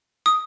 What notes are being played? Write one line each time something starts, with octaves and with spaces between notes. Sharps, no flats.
D#6